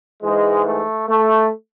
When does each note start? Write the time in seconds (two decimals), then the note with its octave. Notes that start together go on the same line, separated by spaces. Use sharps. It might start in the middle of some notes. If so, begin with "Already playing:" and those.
0.22 G#2 E3 G#3
0.65 A3
1.08 A3